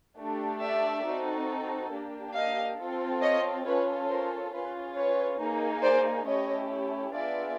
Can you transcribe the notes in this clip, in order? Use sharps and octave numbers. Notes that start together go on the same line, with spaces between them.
A3 D4 G4
D5 E5
C4 D#4 F#4 A4
A#3 D4 G4
D#5 F5
C4 F4 A4
C#5 D#5
C#4 F4 A4 B4 C#5
A#4 C5
C#4 F4 G#4 B4
B4 C#5
A#3 D#4 G#4
C5 D5
A3 C#4 E4 G4 C#5 D#5
B3 D4 F4 G#4 D5 E5